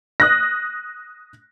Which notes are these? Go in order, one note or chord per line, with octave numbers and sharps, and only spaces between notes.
D#6 F#6 A#6